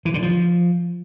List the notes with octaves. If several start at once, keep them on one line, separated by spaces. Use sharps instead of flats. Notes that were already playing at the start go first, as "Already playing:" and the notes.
E3
D3
F3